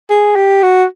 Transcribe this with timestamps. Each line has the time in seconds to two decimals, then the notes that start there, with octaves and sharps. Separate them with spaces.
0.10 G#4
0.36 G4
0.63 F#4